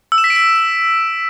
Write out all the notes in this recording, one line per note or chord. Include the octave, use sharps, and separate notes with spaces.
E6
E7
B6
D7
B6